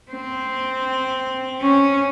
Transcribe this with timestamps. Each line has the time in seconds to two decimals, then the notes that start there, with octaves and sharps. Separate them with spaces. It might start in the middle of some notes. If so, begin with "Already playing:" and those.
0.12 C4
1.61 C#4